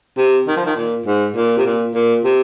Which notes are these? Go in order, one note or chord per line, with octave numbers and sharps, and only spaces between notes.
C3
D#3
F3
D#3
A#2
G#2
A#2
C3
A#2
A#2
C3